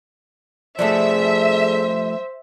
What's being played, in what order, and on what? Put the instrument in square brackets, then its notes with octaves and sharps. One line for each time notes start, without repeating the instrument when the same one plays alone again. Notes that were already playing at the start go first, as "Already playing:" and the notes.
[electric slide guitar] F3 G3 A3 [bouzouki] D4 G#4 A4 [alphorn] C5 [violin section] E5